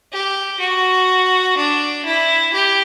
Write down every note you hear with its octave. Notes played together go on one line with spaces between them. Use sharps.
G4
F#4
D4
E4
G4